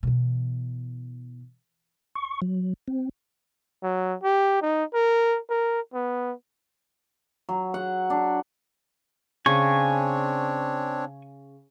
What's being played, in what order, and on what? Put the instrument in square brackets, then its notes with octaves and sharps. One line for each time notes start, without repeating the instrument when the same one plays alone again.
[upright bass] B2 E3
[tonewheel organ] C#6
F#3
C4
[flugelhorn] F#3
G4
D#4
A#4
A#4
B3
[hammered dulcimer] F#3
F#5
D4
[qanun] C#3 [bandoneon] C4 D4 C#5 [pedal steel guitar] G#5 C#6